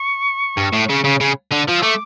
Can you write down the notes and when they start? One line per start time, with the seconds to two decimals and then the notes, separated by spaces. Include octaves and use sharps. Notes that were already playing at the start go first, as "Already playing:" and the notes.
Already playing: C#6
0.57 G2
0.73 A2
0.90 C#3
1.04 C#3
1.20 C#3
1.51 D3
1.68 F3
1.78 E6
1.82 A3 D6